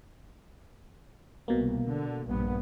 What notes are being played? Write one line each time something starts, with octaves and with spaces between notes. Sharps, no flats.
C2 B2 A#3
D3
A#1 G2 B3